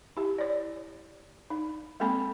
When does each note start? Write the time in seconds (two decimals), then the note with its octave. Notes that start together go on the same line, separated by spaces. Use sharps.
0.17 E4 G4
0.38 C#5 D5
1.50 D#4
2.00 G#3 A#3 C4 A4 G#5 B5